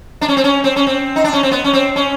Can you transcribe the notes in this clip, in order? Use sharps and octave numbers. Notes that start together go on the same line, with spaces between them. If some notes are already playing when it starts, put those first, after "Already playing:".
D4
C#4
C4
C#4
C4
C#4
C4
D#4
D4
C#4
C4
B3
C#4
C4
C#4